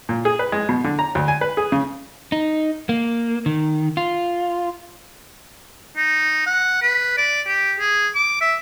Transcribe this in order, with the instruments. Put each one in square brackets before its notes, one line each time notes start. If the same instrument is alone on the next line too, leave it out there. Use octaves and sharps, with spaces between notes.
[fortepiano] A#2
G#4
B4
G#3
B2
D3
A#5
D2
G#5
B4
G#4
C#3
[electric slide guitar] D#4
A#3
D#3
F4
[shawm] D#4
F#5
B4
D5
G4
G#4
D6
E5